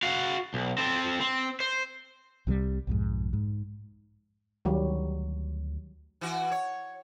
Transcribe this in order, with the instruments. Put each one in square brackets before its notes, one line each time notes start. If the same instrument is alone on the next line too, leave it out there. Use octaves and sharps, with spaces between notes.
[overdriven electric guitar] F#4 F5
B1
C4 A4
C4
C5
[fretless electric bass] C2 C3 F#3 G3
B1 F2 G#2
G#2
[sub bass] D2 [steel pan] D#3 F#3 G3
[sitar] E3 F#4
C#5